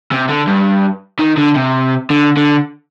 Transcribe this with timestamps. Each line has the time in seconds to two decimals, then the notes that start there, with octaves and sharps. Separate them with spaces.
0.12 C3
0.29 D3
0.47 G2
1.19 D#3
1.38 D3
1.56 C3
2.10 D3
2.37 D3